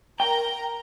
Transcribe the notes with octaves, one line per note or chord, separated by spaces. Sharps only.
A#4 G5 A#5